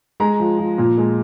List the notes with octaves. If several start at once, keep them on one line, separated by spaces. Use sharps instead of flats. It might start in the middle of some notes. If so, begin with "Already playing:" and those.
G#3 A#5
F3
F3
A#2
G#3